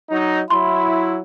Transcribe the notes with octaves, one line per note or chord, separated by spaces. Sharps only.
F#3 D#4
F#3 E4 B5 C6